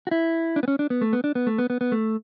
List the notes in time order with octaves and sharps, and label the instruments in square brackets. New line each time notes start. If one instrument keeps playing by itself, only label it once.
[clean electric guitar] F#4
E4
D4
B3
C#4
D4
B3
A3
B3
D4
B3
A3
B3
B3
B3
A3